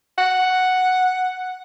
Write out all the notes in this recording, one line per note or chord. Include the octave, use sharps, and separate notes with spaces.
F#5